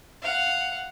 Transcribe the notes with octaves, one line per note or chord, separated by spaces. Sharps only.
F5 F#5